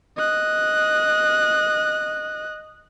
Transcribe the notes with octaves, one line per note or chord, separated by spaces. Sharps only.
D#5 F#6